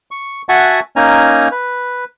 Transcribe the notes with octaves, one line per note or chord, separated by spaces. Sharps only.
C#6
F#4 E5 F#5 G#5 A5 C#6
A#3 C#4 D#4 G#5 A#5
B4